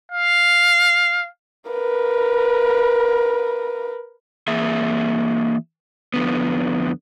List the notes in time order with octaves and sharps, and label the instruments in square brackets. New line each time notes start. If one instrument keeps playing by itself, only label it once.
[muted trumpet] F5
[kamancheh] A#4 B4
[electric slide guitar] E3 A#3 G#4 E5
F2 D3 B3